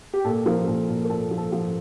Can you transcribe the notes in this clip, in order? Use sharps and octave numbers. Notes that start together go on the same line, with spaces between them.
G4
A#2 A4
F3 A#4
A#2 A4
A#2 F4
A#4
A#2 A4
F3
A4
F3